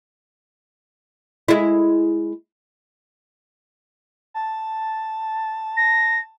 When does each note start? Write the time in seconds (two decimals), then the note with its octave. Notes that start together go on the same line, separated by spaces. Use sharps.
1.48 G#3 E4
4.34 A5
5.77 A#6